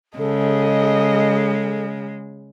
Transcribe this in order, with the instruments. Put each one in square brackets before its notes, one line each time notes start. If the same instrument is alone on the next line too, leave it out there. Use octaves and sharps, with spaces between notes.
[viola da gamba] C#3 [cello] G#3 [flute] A4 [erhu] D#5